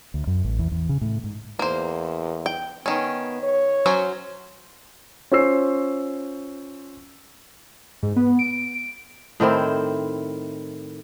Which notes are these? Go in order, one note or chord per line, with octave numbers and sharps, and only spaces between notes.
D2
F#2
A1
E2
E2
C#3
A2
G#2
E2 A#3 C5
G5
D#3 B3 C#4
C#5
F#3 C#4 C5
C#4 F4 C5 C#6 E6 C7
G#2
B3
D7
A2 D#3 C4 E4